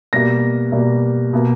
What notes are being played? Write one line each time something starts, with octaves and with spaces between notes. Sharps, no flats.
B2 G3 A#3 A#6
B2 G3 A#3
B2 A#3